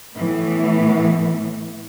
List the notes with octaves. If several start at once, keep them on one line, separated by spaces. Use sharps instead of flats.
A2 E3 A3 B3